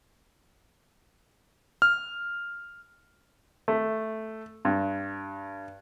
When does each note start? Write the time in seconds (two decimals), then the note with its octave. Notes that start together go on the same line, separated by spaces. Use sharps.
1.82 F6
3.68 A3
4.65 G2